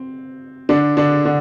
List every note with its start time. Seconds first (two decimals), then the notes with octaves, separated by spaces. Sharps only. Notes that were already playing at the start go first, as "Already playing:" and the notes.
Already playing: C4
0.69 D3 D4
0.97 D3 D4
1.25 D3